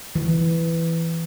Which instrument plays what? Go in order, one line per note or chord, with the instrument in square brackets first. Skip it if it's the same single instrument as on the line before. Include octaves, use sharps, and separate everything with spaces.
[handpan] E3